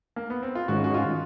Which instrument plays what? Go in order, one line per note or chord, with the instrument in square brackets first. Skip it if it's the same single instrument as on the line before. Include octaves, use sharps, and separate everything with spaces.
[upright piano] A#3
B3
C4
F4
[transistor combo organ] G#2 D#3 G#3 C#4 [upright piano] F#4
[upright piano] F#4
F4